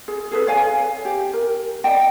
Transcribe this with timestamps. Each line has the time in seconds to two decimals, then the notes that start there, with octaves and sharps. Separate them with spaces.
0.08 G#4
0.31 G#4 A4 B4
0.47 C#5 F5 G#5
1.05 G4
1.33 A#4
1.84 D5 D#5 G5 A5